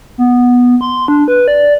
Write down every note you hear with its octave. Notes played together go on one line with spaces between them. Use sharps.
B3
C6
D4
B4
D5